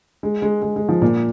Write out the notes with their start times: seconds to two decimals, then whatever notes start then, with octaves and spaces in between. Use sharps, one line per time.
0.23 G#3
0.42 G#3
0.62 G#3
0.76 G#3
0.89 F3
1.02 A#2